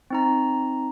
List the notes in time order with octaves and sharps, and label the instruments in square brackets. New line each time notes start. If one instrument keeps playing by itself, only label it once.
[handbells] C4 D#4 A#5